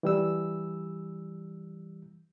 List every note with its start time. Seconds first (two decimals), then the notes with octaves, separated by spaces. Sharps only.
0.03 E3 G3 E6